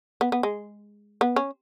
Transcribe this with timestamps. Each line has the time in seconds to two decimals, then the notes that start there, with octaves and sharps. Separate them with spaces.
0.21 B3
0.32 B3
0.43 G#3
1.21 B3
1.36 C#4